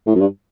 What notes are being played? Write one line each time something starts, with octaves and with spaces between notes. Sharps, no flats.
A2
F#2
G2